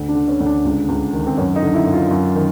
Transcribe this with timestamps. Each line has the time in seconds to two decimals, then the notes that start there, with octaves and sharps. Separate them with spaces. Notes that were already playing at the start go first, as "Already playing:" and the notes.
Already playing: D2
0.09 D4
0.15 D3
0.28 C#4
0.40 D2
0.46 D4
0.64 C#2
0.89 C#2
1.13 D#3
1.27 C4
1.37 F#2 C#4
1.56 D#4
1.62 D3
1.74 E4
1.86 F#2
1.93 F4
2.11 F#2
2.35 D#3